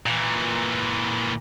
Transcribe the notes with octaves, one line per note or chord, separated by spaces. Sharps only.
A#2 E3